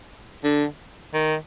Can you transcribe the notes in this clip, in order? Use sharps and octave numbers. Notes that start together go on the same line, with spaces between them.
D3
D#3